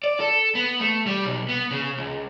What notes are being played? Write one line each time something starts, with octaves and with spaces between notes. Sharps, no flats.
D5
A4
B3
A3
G3
B1
B3
C#3
C#2